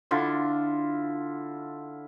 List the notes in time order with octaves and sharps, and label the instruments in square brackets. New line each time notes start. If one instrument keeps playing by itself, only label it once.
[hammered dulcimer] D3 E4 F4